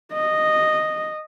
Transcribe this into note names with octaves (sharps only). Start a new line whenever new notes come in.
D#5